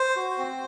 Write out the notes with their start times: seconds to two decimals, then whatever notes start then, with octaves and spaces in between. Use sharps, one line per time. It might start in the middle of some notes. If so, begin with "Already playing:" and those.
Already playing: C5
0.16 F#4
0.38 C4